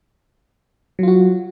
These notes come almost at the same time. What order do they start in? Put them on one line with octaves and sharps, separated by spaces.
F#3 F4 F#4